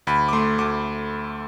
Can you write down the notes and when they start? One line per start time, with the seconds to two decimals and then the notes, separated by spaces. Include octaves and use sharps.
0.07 D2 B5
0.28 D6
0.33 A3 C6
0.58 D2 D6